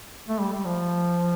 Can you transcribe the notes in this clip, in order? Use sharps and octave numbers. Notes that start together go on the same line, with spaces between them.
A3
G3
G3
F3